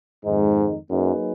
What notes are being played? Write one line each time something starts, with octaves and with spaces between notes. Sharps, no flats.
F2 G#2 D#3 G#3 D#4
F#2 F#3 A#3 D#4 G#4 B4